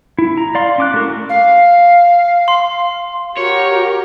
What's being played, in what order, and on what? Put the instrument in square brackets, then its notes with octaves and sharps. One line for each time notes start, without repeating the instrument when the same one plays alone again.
[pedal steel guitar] E4
A#5
D5 F5 C6
C#4 D6 F#6
A3 E4 F#4 A#4
[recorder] F5
[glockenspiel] C6
[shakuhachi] F#4 [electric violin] G4 A#4 [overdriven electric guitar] C#5